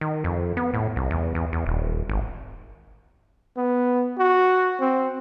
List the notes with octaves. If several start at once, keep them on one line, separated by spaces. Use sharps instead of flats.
D#3
F2
B3
A2
C2
E2
E2
E2
D#1
G#1
B3
F#4
C4